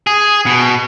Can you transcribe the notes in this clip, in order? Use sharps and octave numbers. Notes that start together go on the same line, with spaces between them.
G#4
B2